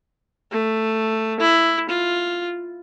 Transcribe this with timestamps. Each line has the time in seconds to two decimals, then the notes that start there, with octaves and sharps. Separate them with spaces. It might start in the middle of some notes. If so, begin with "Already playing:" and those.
0.51 A3
1.40 E4
1.89 F4